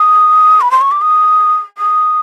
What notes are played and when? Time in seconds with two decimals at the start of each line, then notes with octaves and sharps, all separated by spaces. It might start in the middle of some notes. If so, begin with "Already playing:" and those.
Already playing: D#6
0.61 B5
0.71 C6
0.81 C#6
0.91 D6
1.01 D#6
1.78 D#6